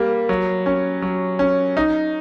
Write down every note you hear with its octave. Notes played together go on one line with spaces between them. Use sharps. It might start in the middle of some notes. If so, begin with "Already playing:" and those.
Already playing: G3 A#3
F#3
C#4
F#3
C#4
D#4